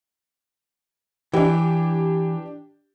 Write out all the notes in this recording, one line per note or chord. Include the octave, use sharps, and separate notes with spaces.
E3 D4 G4